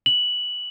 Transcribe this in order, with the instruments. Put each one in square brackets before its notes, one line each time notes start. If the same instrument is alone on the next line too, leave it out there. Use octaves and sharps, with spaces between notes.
[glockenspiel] F#7